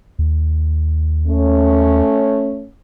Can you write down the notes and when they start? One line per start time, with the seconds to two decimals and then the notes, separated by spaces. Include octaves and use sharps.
0.19 D#2
1.27 A3 C#4